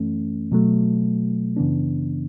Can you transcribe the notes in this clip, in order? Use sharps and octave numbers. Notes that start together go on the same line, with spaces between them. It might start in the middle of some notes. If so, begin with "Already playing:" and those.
Already playing: F#2 E3 A3 C#4
B2 F#3 A3
F#2 C#3 E3 B3 D4